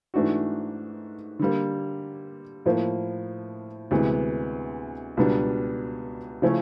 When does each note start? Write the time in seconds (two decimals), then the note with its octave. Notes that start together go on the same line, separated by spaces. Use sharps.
0.14 G#2 E3 A3 D4 F#4
1.39 D3 G3 A#3
2.66 A2 F3 A#3
3.91 D2 C3 E3 G#3 B3
5.17 C#2 B2 G3 B3 D4
6.42 C#3 F3 A3 C#4 E4